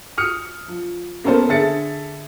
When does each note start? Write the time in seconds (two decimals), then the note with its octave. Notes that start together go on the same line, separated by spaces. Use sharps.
0.18 D#6 F6 C#7
0.68 F3
1.24 A#3 B3 C#4 A4 A#4 C5
1.49 D3 G#4 A4 E5 A6 C#7